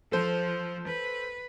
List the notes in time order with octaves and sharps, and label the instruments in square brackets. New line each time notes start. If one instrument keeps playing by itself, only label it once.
[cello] F3 [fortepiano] A4 C5
[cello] B4